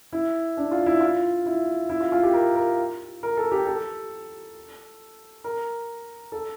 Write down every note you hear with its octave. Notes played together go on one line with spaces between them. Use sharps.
E4
D4
F4
E4
F4
E4
E4
F4
F4
G4
A#4
A#4
A#4
A4
G4
A4
A#4
A4